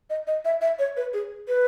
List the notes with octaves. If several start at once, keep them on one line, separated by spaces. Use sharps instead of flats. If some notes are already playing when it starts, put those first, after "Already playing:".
D#5
D#5
E5
E5
C#5
B4
G#4
B4